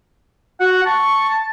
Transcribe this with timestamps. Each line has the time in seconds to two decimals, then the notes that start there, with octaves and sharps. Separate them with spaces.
0.60 F#4 F#5
0.86 A5 C#6